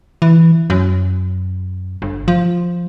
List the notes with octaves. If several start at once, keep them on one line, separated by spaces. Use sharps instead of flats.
E3
F#2
G1
F3